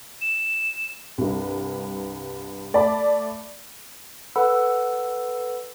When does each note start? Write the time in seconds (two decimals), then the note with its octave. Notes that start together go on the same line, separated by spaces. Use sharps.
0.21 E7
1.18 C2 G2
2.74 A3 D5 A5 B5
4.36 A4 B4 F#5 B5 E6